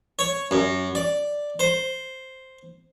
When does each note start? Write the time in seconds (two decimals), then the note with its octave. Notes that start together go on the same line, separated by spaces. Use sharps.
0.19 C#5
0.51 F#2
0.95 D5
1.59 C5